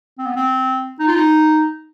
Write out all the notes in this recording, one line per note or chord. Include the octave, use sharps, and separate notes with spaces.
C4
B3
C4
D#4
F4
D#4